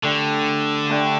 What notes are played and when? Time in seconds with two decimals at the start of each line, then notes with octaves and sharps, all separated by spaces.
0.02 D3 A3 D4 G4
0.89 A3 D4 G4